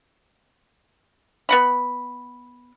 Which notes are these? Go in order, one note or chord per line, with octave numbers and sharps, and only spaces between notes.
B3 F#5 B5